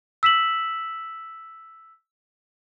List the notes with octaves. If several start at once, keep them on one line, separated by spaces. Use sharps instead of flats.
E6 B6 E7 F#7